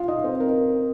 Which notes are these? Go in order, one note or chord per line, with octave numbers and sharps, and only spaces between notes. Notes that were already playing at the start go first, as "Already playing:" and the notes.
Already playing: F4 F5
D#4 D#5
C4 C5
A#4